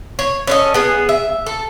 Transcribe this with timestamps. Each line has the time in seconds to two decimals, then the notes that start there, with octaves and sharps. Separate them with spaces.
0.19 C#5
0.47 C#4 A4 D#5
0.74 B3 G#4
1.09 E5
1.46 A4